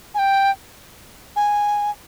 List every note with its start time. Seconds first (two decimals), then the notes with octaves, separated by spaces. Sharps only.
0.14 G#5
0.19 G5
1.36 G#5